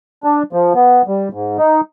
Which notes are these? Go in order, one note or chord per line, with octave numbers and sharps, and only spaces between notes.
D4
F3
B3
G3
G#2
D#4